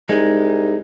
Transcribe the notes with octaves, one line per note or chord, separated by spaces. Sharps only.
C2 G#3 D#4